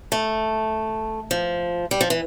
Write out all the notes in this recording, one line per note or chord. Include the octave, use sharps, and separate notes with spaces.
A3
F3
G3
F3
E3